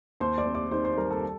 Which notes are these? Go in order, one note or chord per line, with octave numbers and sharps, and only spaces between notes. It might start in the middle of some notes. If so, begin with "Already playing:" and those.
D#2 C5 C6
D5 D6
C4
D5 D6
D#3 C5 C6
C5 C6
G3 A#4 A#5
A4 A5